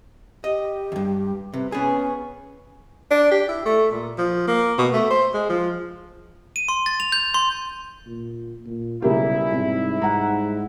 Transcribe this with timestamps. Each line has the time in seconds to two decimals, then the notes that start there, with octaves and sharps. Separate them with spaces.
0.44 G4 D#5
0.92 E2 G2
1.54 C3 B4
1.72 B3 C#4 G#4
3.11 D4
3.32 G4
3.49 E4
3.66 A3
3.92 A#2
4.18 F3
4.48 A#3
4.78 B2
4.93 A3
5.11 C5
5.34 G#3
5.50 F3
6.56 D#7
6.69 C6
6.86 A6
7.00 F7
7.12 G6
7.34 C6
8.07 A#2
8.66 A#2
9.02 B1 C#3 G3 A#3 E4 G4
9.52 G#2 C3
10.02 G#2 F#5 A#5